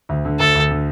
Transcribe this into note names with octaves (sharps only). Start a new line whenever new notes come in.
D2
D3
D2 A4
D2
D3